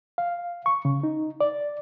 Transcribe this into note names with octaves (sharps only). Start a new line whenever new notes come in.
F5
C#6
C#3
D#4
D5